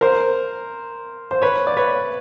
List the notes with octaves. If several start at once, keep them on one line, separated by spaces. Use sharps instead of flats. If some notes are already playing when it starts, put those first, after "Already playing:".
A#4 C5
C5
B4 C#5
D5
B4 C#5